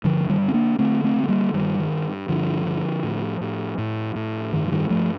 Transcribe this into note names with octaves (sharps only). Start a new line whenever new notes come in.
G2 D3 F3
D#3 G3
D3
C4
A#3 D4
D3 A3 C4
A3 C4
D3
A3
G3 A#3
G2 D#3 G3
D#3
G2
G2 D3 F3
D3
A2
A2
A2
A2
G2 D#3
F3
D#3 G3
G2 F3 A3